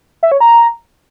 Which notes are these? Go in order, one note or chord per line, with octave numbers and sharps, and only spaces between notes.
E5
C#5
A#5